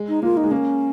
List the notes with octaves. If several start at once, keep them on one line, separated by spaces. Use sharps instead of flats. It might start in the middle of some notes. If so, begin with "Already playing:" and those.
Already playing: G#3
D#4
A#3 F4
D#4
G#3
A#3 C#4